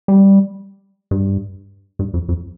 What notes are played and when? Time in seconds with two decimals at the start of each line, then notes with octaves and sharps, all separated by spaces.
0.08 G3
1.11 G2
1.99 G2
2.14 F2
2.29 F2